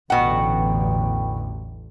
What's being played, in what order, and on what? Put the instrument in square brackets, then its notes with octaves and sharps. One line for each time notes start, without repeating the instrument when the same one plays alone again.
[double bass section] A1 E2 D3 [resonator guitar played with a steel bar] B2 F#5 [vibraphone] G5